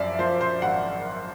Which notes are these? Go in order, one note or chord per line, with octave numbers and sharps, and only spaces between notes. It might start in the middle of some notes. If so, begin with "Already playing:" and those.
Already playing: F#2 F3 D5 E5
F3 C5
C5
G#1 F#5